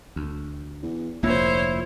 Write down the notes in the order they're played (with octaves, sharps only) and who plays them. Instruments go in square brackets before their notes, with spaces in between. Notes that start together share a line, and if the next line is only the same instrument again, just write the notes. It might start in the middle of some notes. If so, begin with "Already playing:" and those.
[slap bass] D2
[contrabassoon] E2
[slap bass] F1 D2 A#3 [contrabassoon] A#2 [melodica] E4 [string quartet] C5 C#5